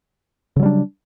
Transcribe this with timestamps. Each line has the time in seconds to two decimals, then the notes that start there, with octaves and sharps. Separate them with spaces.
0.56 C#3
0.60 F#3
0.63 G3
0.66 D4